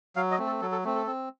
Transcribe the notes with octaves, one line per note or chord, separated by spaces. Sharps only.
F#3 F5
D#5
A3 C4
A4
F#3 A4
A4
A3 C4
A4
C4